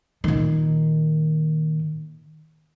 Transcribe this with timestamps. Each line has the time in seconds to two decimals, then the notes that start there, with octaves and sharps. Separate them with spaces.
0.24 A#2 D#3